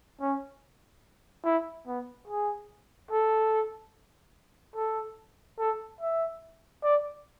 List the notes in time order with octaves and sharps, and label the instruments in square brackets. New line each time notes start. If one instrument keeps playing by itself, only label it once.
[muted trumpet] C#4
E4
B3
G#4
A4
A4
A4
E5
D5